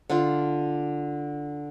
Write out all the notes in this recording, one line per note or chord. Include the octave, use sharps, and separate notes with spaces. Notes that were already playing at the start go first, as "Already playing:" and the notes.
D3 D4 F4